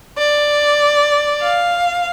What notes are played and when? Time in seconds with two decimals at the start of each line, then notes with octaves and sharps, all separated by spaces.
0.18 D5
1.42 F5